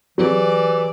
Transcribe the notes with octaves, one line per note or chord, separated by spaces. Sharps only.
E3 F#3 G4 G#4 D5